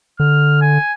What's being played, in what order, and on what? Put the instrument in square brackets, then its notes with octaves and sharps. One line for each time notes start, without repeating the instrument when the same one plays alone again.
[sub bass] D3 [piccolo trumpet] F6
[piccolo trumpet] G#5